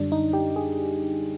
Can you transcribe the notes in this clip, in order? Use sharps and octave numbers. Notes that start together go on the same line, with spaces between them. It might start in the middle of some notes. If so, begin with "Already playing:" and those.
Already playing: F#2 D3 G3 D4
D#4
G4
G#4